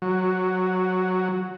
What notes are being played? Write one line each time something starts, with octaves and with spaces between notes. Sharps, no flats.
F#3